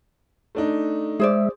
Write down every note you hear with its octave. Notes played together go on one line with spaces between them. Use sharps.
A3 D4 D#4
G#3 G#4 C5 D5 E5